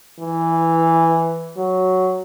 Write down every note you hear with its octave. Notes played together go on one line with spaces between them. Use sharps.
E3
F#3